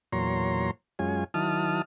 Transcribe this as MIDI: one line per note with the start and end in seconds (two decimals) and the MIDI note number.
0.13 0.71 40
0.13 0.71 46
0.13 0.71 54
0.13 0.71 73
0.13 0.71 82
0.13 0.71 84
0.99 1.24 42
0.99 1.24 56
0.99 1.24 61
0.99 1.24 65
0.99 1.24 80
1.34 1.82 51
1.34 1.82 54
1.34 1.82 64
1.34 1.82 81
1.34 1.82 87
1.34 1.82 89